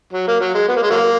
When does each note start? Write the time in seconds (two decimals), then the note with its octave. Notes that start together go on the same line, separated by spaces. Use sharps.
0.13 F#3
0.28 A#3
0.40 F#3
0.54 G#3
0.68 B3
0.76 A#3
0.82 G#3
0.90 F#3 A#3